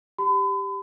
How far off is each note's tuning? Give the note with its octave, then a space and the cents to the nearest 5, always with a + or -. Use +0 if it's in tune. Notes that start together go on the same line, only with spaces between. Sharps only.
G4 +0 B5 +40